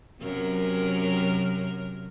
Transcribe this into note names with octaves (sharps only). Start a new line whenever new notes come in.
F#2 C3 A#4